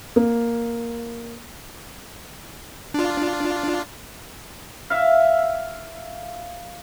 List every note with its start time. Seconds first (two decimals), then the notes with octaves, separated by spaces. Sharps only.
0.16 A#3
2.94 D4 F4
4.90 E5 F5